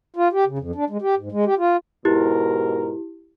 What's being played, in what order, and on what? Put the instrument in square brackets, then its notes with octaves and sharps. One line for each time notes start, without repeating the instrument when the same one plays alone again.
[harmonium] F4
G4
C#3
F2
D4
G#3
G4
G#2
G#3
G4
F4
[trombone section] G#2 B2 A#4 [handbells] E4 G4